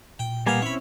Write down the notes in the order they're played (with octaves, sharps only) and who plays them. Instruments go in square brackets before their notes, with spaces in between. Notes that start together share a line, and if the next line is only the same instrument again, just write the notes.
[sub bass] A#2 [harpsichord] G5
[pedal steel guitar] G3 A#3 G#5 [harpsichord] B3 F5
[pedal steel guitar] C4 C#4 E4 [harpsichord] C#5 B5